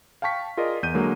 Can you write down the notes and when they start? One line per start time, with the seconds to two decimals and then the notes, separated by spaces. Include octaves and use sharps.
0.22 F5 G5 A5 C#6 B6
0.57 F4 G#4 A#4 D5 D#5
0.83 E2 G6 D#7
0.94 D3 F#3 G#3 A#3